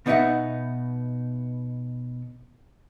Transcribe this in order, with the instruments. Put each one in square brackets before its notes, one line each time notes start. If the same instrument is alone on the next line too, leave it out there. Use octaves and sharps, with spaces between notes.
[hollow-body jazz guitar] B2 B3 D#4 D5 E5 F#5